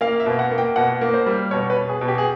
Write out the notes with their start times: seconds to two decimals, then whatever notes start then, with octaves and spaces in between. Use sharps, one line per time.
0.01 A#3 F5
0.20 E5
0.26 B2
0.39 F#5
0.51 A#3
0.58 G5
0.76 B2 F#5
1.01 A#3
1.14 C5
1.26 G3
1.51 B2 C#5
1.70 B4
1.76 B2
1.89 G#4
2.01 B2
2.08 G4
2.18 G#4